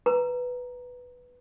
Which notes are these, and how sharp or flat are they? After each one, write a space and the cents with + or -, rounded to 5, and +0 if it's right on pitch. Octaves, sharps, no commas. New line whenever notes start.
B4 +0 A#5 +0